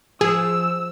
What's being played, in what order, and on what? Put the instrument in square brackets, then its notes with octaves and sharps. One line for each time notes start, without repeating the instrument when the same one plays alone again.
[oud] F3 [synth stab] G#4 [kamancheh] E6